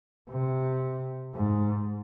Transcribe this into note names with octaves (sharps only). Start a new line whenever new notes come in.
C3
G#2